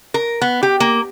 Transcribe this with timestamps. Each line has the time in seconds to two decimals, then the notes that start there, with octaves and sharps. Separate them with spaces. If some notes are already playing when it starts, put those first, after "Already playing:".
0.14 A#4
0.41 B3
0.63 G4
0.80 A#3